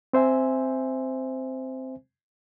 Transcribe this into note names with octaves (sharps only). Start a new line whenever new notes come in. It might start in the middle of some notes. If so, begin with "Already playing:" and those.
C4 C5 E5 G#5